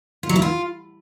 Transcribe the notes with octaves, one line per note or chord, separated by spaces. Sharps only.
F4
F#3
E4
F4